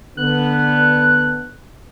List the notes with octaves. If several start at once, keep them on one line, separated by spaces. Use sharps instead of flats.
D3 B3 F#6